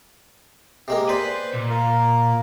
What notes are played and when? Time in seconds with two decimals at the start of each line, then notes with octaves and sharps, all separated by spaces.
0.88 C3 G#3 A#3
1.09 B4 C5 D5
1.53 A#2
1.70 A#3 A#4